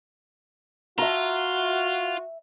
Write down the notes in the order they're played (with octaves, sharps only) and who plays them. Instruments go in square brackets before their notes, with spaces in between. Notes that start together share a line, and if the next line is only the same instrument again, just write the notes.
[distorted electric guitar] F4 [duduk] F#4 [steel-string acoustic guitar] E5 A#5